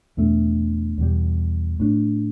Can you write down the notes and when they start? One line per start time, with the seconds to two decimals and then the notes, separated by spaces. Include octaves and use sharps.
0.17 E2 B2 A3 D4
0.98 E2 B2 G3
1.80 A2 A3 D4